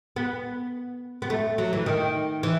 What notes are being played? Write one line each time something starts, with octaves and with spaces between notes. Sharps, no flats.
B3
B3
A3
F#3
E3
D#3
E3